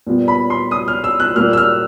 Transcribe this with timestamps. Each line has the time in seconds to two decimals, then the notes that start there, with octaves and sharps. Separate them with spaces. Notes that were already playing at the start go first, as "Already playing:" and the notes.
0.07 A#2 G3 B3
0.28 B5
0.50 C6
0.71 D#6
0.88 F6
1.04 E6
1.20 F#6
1.36 A#2 G3 A#3 F6
1.53 E6
1.57 F6